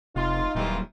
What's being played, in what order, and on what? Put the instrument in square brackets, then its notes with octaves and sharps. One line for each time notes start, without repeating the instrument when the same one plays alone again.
[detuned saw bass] F1 [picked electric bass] C3 [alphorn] D#4 [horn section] F4
[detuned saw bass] D#1 [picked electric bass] A#2 F#3 G3 [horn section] D#3 E3 F4